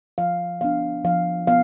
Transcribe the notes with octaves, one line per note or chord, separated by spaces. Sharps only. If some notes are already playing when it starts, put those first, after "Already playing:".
F3 F5
B3 D4 F5
F3 F5
B3 F5